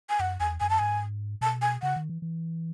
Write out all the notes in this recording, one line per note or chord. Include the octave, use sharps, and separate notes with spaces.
G#5
F#2 F#5
E2 G#5
F#2 G#5
A5
G#2 G#5
B2 A5
G#5
C#3 F#5
D#3
E3
E3